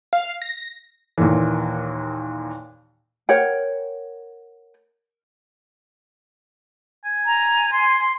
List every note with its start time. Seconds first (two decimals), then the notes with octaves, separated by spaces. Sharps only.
0.13 F5
0.42 A#6
1.18 D#2 A#2 E3
3.29 A#4 C#5 F#5 G5
7.05 G#5
7.26 A#5
7.72 C6